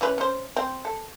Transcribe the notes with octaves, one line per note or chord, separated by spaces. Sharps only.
E3 C#4 B4
C#4 C5
C4
A4